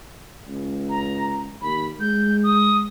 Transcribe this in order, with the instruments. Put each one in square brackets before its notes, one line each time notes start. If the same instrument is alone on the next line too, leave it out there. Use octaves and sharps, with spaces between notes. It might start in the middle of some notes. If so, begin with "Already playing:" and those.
[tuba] C#2
[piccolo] A#5
[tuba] D#2 [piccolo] B5
[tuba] G#3 [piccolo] G6
[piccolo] D#6